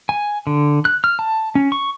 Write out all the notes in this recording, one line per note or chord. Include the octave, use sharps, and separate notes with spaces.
G#5
D3
F#6
F6
A5
C#4
C#6